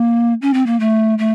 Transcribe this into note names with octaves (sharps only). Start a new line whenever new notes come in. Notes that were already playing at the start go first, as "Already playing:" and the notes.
Already playing: A#3
C#4
C4
A#3
A3
A3